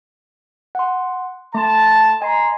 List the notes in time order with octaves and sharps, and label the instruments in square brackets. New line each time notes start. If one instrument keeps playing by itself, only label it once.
[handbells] F#5 C6
[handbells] A3 C6 [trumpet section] A5
[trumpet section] D#5 A#5 C6 [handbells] G#5